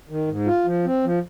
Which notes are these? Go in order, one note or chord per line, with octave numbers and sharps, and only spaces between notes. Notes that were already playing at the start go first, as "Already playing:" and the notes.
D#3
G#2
F4
F3
C4
F3